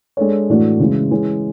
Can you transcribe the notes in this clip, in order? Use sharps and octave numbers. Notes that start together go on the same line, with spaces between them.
G#3 D4 A4 C#5
A2 E3 A3 D4 F#4
C#3 E3 G#3
E3 G#3 C#4 G#4